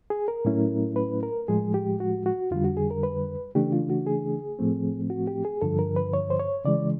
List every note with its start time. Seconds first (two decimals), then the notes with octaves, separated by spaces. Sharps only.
0.10 G#4
0.28 A#4
0.45 A2 F#3 A3 C#4 E4
0.96 B4
1.23 A#4
1.48 A2 F3 G#3 G#4
1.74 G4
2.00 F#4
2.26 F#4
2.51 F2 D3 G3 F4
2.64 F#4
2.77 G#4
2.91 A#4
3.03 B4
3.55 C#3 E3 A3 D4 G4
3.73 F4
3.90 F#4
4.07 G#4
4.59 A2 F3 A3 C4
5.10 F#4
5.27 G4
5.45 G#4
5.62 G2 D3 F3 A4
5.79 A#4
5.96 B4
6.14 C#5
6.30 C5
6.40 C#5
6.65 C#3 E3 G#3 D5